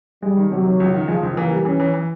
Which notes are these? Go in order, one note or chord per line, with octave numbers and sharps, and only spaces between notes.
G3 G#3
D#3
C3 F#3
D#3
C#2
D#3
F3 G#3
C#2
E3 A#3
G3
E3 C#4
E3
E3